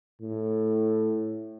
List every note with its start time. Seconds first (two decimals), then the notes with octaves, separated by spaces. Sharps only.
0.21 A2